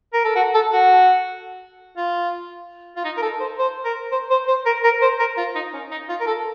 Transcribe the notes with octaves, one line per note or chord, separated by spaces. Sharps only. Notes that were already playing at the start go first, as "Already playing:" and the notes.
A#4
A4
F#4
A4
F#4
F4
F4
D#4
A#4
A4
C5
C5
A#4
C5
C5
C5
A#4
A#4
C5
A#4
F4
D#4
C#4
D#4
F4
A#4
A4